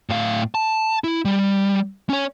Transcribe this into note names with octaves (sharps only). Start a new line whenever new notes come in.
A2 F5
A5
E4
G3
C#4 C#5